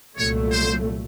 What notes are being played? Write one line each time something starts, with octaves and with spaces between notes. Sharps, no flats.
C2 A#2 F#3 A3 C#5
C5